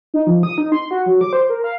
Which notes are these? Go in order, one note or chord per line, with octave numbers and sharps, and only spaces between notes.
D#4
F3
D#6
D#4
C6
F#4
F#3
D6
C5
A#4
F5